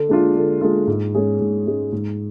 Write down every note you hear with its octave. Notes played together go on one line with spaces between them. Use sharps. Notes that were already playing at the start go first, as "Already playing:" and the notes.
Already playing: D3
G#3 D4 F4
D3
G#3 D4 F4
G#2
G#3 C#4 G#4
G#2
G#3 C#4 G#4
G#2